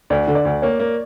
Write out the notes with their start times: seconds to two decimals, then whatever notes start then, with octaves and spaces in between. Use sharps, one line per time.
0.10 D2 D5
0.28 D3
0.35 D5
0.45 D2
0.62 A#3 C#5
0.80 A#3